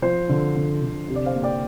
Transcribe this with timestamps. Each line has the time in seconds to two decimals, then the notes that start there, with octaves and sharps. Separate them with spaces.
0.02 F3 C5
0.29 D3
0.56 D3
0.82 D3
1.08 C3
1.16 D5
1.26 C5 F5
1.35 A#3
1.43 D5 G5